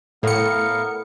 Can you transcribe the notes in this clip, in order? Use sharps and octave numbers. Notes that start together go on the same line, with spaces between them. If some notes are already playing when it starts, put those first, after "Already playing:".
A2 B3 A4 A#4 F5 C#7